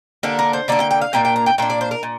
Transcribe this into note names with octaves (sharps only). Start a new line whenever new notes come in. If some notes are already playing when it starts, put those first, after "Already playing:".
D3 A#3 D4 G4
A#4
C5
D3 A#3 D4 D5
G5
G5
F5
A#2 A#3 D4 G5
G5
A#5
G5
A#2 A#3 D4 G5
D5
C5
A#4
A#2